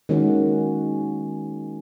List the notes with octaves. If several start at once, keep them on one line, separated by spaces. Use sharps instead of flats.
D#3 G#3 A#3 C#4 F#4